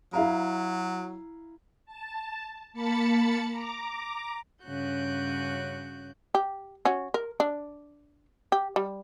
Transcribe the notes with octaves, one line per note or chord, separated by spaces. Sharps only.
F#3 E4 F5 A#5
A5
A#3 A5 B5 A6 C#7
A#5 D6
G2 C#3 C#4 F#4 F#6 G6
G4
C#4 F#4
A#4
D4
G4
G3